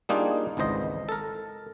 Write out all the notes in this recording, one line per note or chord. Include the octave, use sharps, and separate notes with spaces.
G3 A#3 D4 D#4 F4 G#4
G#1 C#2 E3 C5 D#5
A4 A#4